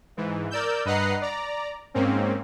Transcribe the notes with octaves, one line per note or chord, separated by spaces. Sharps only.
G#2 E3
A#4 D5 E6 G6
G2 B4 D#5 F#5 A#5 C7
D5 A#5
G#2 A#3 C4 C#4